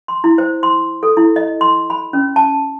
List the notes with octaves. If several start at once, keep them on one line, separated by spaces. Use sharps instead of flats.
C6
E4
C5
C6
A4
E4
D#5
C6
B5
C#4
A5